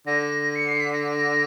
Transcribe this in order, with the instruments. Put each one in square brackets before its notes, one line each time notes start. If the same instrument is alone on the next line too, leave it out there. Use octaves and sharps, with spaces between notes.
[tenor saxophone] D3 [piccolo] A#6
[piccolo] C#7
C7
B6
A#6